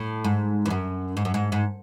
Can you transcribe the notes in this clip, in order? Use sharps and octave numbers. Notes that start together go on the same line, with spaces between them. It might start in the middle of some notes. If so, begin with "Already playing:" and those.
Already playing: A2
G#2
E2
F#2
G#2
F#2
G#2
G#2